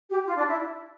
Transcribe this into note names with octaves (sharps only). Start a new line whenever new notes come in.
G4
F4
D4
E4